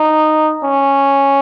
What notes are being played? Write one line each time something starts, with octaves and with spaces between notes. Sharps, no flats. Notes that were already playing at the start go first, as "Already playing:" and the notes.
Already playing: D#4
C#4